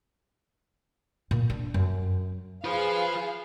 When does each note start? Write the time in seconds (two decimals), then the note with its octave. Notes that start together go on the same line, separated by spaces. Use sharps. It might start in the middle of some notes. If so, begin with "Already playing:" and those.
1.31 A#2
1.50 D4
1.74 F#2
2.64 F4 G#4 B4 C5 F5